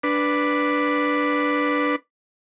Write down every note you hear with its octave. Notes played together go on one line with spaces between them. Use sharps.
D4 B4